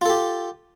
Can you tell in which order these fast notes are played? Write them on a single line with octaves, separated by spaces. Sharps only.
F4 A4 G4